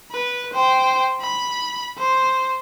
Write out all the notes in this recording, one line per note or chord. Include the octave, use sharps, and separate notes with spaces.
B4
C5 G5
B5
C5